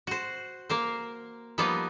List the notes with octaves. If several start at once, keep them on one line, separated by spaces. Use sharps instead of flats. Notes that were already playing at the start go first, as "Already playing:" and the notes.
F#4 C5
A#3 A#4 C5
F3 G3 A#3 B3 D#4